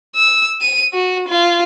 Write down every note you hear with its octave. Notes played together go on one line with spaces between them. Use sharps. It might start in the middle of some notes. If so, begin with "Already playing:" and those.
E6
D#7
F#4
F4